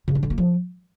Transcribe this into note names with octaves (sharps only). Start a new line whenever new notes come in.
C#3
D4
D3
A#3
F3